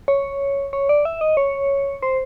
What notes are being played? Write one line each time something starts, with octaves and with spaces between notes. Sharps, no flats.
C#5
C#5
D5
E5
D#5
C#5
C5